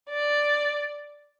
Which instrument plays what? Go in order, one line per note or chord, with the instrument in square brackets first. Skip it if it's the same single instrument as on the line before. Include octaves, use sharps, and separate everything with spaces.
[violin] D5